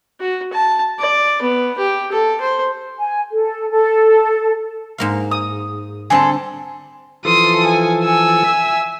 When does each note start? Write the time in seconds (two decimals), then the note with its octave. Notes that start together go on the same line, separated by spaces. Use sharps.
0.20 F#4
0.53 A5
0.99 D5
1.41 B3
1.78 G4
2.11 A4
2.41 C5
2.98 G#5
3.32 A4
3.70 A4
4.98 G#2 A#3 F5
5.31 D#6
6.10 D3 G3 C4 G#4 A4
7.25 E3 F3 A4 C6 D#6
7.67 G#5
8.03 G#5 E6
8.44 E5